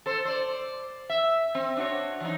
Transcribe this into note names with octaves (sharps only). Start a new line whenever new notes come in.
A4 C5
C5 D5
E5
C4
D4 F#4 C#5
E3 F#3 D#4